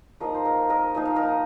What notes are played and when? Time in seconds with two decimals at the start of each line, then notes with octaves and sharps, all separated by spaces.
0.20 F3 A#3 D#4 A#4 D#5
0.34 C5
0.45 A#4 D#5
0.69 A#4 D#5
0.95 F3 A#3 D#4 D#5
1.05 F5
1.16 A#4 D#5